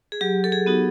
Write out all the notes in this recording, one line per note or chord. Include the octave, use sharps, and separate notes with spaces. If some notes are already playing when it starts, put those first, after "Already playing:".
G#4
F#3 G4
A4
G#4
B3 D#4 F#4